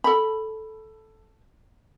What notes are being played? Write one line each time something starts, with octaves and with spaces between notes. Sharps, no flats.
A4 B5